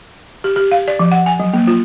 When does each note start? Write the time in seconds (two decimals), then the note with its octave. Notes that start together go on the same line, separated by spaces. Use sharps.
0.44 G4
0.56 G4
0.72 F5
0.88 D5
0.99 F3
1.12 F#5
1.26 G#5
1.40 F#3
1.53 A#3
1.68 F4